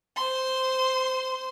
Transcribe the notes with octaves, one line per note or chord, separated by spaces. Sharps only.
C5 C6